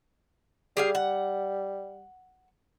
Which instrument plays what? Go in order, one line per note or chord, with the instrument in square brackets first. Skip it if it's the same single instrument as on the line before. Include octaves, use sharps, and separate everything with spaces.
[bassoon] G3 [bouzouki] G4 G#4 F5
[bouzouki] F#5